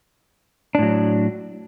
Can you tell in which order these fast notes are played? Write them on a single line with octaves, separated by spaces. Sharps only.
D4 A2 F#3